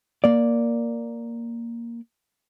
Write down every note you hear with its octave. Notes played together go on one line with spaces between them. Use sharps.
A#3 D5